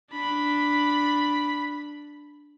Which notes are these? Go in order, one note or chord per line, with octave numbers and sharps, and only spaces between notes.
D4 B5